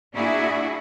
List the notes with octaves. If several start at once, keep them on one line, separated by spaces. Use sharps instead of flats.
A#3 D4 E4 F#4 G#4